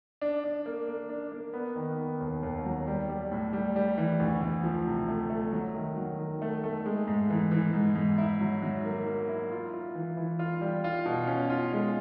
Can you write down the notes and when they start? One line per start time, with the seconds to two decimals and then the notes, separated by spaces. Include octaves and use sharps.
0.21 D4
0.44 D4
0.66 A#3
0.88 A#3
1.09 D4
1.32 A#3
1.53 B3
1.76 D#3
1.98 B3
2.21 D#2
2.43 D#2
2.65 F#3
2.87 G3
3.09 G3
3.31 A2
3.53 G3
3.76 G3
3.98 E3
4.20 D2
4.41 D2
4.63 F3
4.86 C3
5.08 A3
5.30 A3
5.53 F#3
5.74 D#3
5.96 F#3
6.19 D#3
6.42 A3
6.64 A3
6.86 G#3
7.08 G#2
7.30 E3
7.51 E3
7.73 G#2
7.95 G#2
8.18 E4
8.40 F#3
8.62 F#3
8.84 A#3
9.06 A#3
9.29 E4
9.51 F4
9.73 F4
9.95 E3
10.17 E3
10.39 F4
10.61 G3
10.84 F4
11.06 B2
11.27 C#4
11.50 F4
11.73 G#3